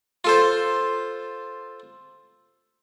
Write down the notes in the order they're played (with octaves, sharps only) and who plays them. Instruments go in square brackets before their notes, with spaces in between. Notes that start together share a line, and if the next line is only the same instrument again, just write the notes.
[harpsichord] F4 A4 C5